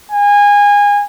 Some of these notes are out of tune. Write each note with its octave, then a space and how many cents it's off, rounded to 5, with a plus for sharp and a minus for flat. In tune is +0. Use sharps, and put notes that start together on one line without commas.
G#5 -25